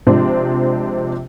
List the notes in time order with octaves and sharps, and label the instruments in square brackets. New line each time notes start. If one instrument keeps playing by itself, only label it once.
[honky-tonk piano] C3 F3 G#3 C4 D4